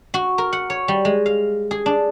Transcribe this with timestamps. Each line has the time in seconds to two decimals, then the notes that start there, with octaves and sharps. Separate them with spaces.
0.14 F#4
0.38 A#4
0.53 F#5
0.70 C#5
0.88 G3
1.05 G#3
1.26 F5
1.71 G#4
1.86 D4